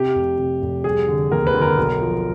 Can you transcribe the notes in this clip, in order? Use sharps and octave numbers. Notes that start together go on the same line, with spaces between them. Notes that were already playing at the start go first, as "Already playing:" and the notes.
Already playing: C3 G4
F1
C3
F1
G3 G#4
D3
D#2 A#4
B4
D3
A#4
B1
F3